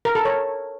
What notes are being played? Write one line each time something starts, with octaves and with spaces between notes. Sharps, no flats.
A#4
A4
C#5